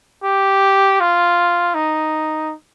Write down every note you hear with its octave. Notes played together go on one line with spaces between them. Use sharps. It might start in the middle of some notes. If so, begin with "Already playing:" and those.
G4
F4
D#4